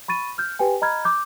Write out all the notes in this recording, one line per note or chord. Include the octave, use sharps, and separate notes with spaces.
B5 C#6 A6 D#7
F6 G6
G4 B4 G5 G#5
D#5 A#5 B5 F6 G#6
D6 G6